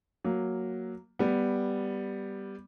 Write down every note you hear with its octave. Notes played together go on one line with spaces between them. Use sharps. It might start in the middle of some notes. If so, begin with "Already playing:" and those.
F#3 A#3
G3 B3